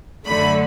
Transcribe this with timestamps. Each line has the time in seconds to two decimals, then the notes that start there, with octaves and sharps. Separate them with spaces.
0.25 F#2 D3 F#3 A3 B5